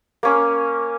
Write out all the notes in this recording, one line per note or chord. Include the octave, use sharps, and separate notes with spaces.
A#3 C#4